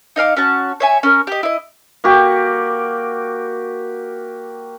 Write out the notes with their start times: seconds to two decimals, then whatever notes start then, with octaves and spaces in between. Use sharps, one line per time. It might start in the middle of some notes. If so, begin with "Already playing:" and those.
0.16 D#4 D#5 F5 D6
0.37 C#4 F#4 A5
0.80 C#5 E5 G#5
1.03 C#4 A#4
1.27 G4 D#5
1.43 E4 D#5
2.04 A#3 F#4 G4